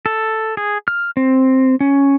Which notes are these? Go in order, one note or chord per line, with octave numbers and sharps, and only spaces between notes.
A4
G#4
F6
C4
C#4